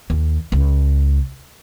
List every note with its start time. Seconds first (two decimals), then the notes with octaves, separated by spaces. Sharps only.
0.10 D#2
0.52 C#2